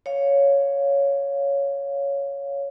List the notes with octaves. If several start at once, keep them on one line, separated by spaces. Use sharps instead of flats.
C#5 F5